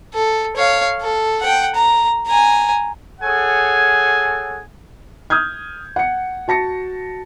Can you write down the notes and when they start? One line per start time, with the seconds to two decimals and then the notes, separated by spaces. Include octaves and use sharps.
0.14 A4
0.57 C#5 F5
1.01 A4
1.41 F#5 G5
1.75 A#5
2.27 G#5 A#5
3.21 G#4 A4 C#5 F#5 G#5
5.30 D#6 F6 G6 G#6
5.96 F#5 C#7
6.48 F#4 A5 A#6 C#7